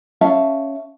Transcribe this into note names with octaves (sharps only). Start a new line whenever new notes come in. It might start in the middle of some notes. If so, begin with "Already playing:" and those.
C#4 E5 F5 A5